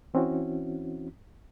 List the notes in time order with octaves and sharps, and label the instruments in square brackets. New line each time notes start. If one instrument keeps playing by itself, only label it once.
[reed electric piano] E3 C4 C#4 E4 F#4